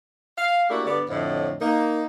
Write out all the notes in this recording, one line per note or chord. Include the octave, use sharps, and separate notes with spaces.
F5
A3 A#3 D4 E4 F#4 G4
G2 D3 B3 D5
F2 A2 D3
A#3 D#4